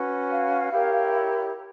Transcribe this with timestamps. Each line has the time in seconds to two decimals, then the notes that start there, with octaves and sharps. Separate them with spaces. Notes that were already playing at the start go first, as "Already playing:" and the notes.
Already playing: C#4 F#4 B4
0.30 F5
0.70 E4 G4 A#4 C#5